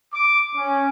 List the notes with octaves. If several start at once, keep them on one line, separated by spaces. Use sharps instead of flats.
D6
C#4